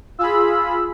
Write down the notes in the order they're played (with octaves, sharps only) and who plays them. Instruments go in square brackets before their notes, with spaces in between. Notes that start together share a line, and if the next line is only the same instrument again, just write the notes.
[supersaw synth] F4 G#4 B5 [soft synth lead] E6